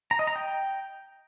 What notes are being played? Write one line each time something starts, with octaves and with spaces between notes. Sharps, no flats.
A#5
D#5
A#5
G5